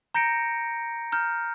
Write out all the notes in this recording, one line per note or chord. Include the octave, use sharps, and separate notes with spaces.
A#5 G6 A#6 C#7 D7
A#5 F6 G6